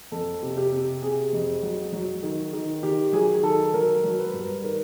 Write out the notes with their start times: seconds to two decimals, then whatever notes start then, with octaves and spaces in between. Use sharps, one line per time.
0.12 F2 A4
0.42 C3
0.57 G4
0.72 C3
1.02 C3 G#4
1.33 F2
1.63 F#3
1.93 F#3
2.23 D#3
2.53 D#3
2.83 D#3 G4
3.13 F#3 G#4
3.43 D#3 A4
3.73 F#3 A#4
4.04 F#3
4.18 B4
4.34 G2
4.64 D#3 A#4